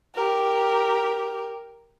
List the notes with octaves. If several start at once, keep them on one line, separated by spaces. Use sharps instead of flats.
G4 A#4